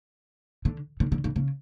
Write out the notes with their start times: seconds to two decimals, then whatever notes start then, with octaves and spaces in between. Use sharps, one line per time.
0.65 D3
1.00 D3
1.12 D3
1.24 D3
1.36 C#3